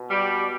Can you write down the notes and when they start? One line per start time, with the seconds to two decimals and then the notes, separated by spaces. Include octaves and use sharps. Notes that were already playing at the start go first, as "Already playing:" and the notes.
Already playing: B2
0.09 G3